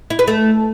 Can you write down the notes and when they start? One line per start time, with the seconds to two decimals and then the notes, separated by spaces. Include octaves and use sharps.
0.10 E4
0.19 B4
0.28 A3